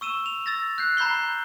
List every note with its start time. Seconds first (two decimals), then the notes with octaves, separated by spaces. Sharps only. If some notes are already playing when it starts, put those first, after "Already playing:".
0.01 C#6 E6 D#7 E7
0.26 F7
0.46 E6 A6 A#6
0.78 F#6 G6 C7
0.97 A#5 B5 G6 C7 G7
1.14 G6